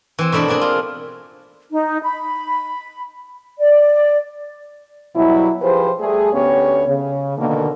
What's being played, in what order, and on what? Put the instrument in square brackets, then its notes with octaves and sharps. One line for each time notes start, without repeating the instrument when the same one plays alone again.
[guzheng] E3 C4
B2 A3 D4 E4 E5
A#3 C4 D4 G#4
F4
[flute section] D#4
B5
D5
[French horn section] B2 F#3 G3 E4
F3 G4 G#4 B4 C5
G3 A3 G#4
D2 B3 C#4 G4 C#5
C#3
B2 D3 D#3 A#3